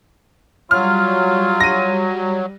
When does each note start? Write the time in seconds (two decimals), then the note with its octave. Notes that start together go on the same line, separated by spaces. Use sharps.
0.71 F#3 G3 F4 F6
1.60 A#6 D#7